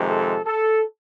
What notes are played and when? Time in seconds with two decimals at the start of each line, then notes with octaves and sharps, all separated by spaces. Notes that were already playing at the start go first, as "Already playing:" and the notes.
Already playing: F2 C3 D#3 G#3
0.09 A4
0.45 A4